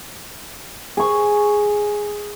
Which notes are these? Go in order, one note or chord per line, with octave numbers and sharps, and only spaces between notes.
G#4 C#6